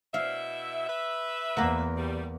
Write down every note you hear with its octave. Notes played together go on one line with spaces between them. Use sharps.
B2 E4 E5 F5
B4 E5
E2 A#3 A#4 F#5
G3